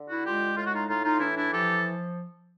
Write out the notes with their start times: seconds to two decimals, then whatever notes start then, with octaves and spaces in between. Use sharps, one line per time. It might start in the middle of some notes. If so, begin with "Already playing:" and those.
Already playing: D3
0.09 E4 F#4
0.25 G#3 F4 G4
0.57 A2 F4
0.65 F#4
0.74 D#4 F4
0.88 A2 D#4 F4
1.04 D#4 F4
1.20 E3 D4 E4
1.35 D4 E4
1.52 F3 G4 A4